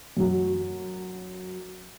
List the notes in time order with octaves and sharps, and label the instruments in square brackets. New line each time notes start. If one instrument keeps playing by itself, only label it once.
[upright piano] F#2 F#3